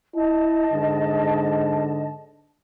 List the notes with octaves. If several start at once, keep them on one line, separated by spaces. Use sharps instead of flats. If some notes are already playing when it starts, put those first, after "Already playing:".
E4 D#5 A5
G#2 D3